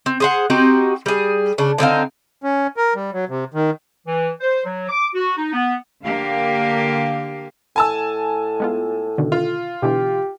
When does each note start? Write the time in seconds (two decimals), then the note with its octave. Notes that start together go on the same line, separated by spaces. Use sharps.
0.06 C4
0.20 G#4 C5 F#5
0.50 C4 D#4 F#4 G4
1.06 G3 G#4
1.58 C#3 D4
1.78 D3 C4 D#4 F5
2.43 C#4
2.77 A#4
2.95 G3
3.13 F#3
3.29 C3
3.54 D#3
4.07 E3
4.41 C5
4.65 F#3
4.89 D6
5.14 F#4
5.37 D#4
5.53 B3
6.05 D3 A#3 G4 F5
7.76 A2 G#5 A5 E6
8.60 G#3 B3 F4
9.18 B2 D3 D#3
9.32 F4
9.83 B2 D3 E3 G4